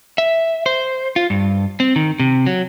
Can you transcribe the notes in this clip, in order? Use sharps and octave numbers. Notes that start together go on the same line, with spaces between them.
E5
C5
F4
G2
C4
D#3
C3
F#3